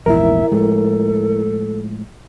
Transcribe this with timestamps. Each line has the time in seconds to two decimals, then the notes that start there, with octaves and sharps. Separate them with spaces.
0.06 A#1 E2 G#2 E4 A#4 E5
0.52 A2 F3 G#3 A4